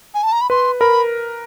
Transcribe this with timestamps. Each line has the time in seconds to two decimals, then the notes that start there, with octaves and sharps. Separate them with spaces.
0.14 G#5
0.23 A5
0.32 A#5
0.41 B5
0.50 B4 C6
0.80 A#4 B5